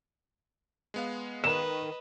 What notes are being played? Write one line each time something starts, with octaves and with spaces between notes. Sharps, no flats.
G#3 B3 F5
D#3 B4 D#5 E7